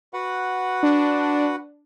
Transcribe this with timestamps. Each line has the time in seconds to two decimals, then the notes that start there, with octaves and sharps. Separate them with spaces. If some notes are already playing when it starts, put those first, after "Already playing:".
0.14 F#4 B4 F#5
0.83 D4